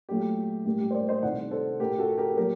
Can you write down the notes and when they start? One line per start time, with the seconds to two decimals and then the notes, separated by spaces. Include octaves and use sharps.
0.09 A#2 F#3 A3 G4
0.65 A2 G3 A#3 G4
0.80 G4
0.90 C5
0.94 A#4 D5
1.09 C5 D#5
1.23 C2 C3 D#3 A3 D5 F#5
1.51 A4 C5
1.80 A2 A3 G4 A#4
1.98 F#4 A4
2.17 G4 A#4
2.37 A#2 F#3 G4 A#4